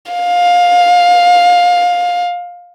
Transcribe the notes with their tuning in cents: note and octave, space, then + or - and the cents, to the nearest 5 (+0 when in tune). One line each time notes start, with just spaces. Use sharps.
F5 +20